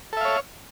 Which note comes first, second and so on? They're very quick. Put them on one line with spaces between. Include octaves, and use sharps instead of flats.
A4 E5 F5 C#5